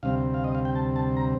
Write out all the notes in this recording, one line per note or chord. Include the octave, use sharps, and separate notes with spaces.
D2 C3 G3 C4 F5
F5
D#5
F5
G5
A5
A5
A#5